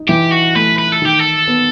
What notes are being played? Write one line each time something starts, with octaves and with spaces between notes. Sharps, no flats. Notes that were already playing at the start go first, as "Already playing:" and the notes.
Already playing: D#4
E3 G4
F#4
A3 B4
B4
A4
D#3 G4
A4
B3